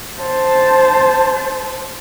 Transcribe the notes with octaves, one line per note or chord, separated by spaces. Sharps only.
C5 A5